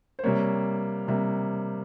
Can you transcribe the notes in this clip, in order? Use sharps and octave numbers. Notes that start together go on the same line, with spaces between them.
C5
C3 G3 A#3 C#5
C3 G3 A#3